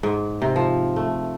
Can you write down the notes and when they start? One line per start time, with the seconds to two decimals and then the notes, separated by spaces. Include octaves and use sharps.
0.03 G#2
0.42 C3
0.56 F3
0.96 A3